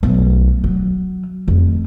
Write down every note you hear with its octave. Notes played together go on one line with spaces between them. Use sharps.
B1 A3
F#3
F2 A3